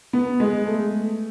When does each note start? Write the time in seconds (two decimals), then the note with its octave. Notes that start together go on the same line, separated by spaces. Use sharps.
0.13 B3
0.40 G#3
0.67 A3